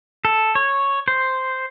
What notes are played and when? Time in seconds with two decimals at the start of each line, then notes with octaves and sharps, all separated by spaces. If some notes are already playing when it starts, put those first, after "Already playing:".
0.25 A4
0.55 C#5
1.08 C5